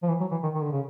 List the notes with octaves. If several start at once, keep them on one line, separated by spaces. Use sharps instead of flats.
F3
E3
F#3
E3
D#3
D#3
D3
C#3